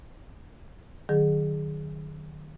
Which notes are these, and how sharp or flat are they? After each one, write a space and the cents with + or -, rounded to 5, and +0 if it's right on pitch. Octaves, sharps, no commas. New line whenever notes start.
D#3 -40 F#3 +0 G#4 +0